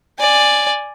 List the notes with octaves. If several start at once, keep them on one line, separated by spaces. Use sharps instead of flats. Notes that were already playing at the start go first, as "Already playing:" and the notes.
D5 G#5